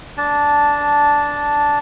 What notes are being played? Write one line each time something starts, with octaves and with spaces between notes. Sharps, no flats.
D4 A5